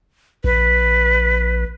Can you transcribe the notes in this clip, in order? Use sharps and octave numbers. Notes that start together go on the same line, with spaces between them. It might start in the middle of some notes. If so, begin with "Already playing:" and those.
A#1 B4